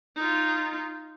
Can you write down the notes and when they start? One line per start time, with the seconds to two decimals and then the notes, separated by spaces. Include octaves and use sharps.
0.16 D#4 F4